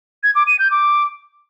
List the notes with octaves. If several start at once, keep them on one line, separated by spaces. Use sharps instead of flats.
G#6
D6
D#7
G6
D6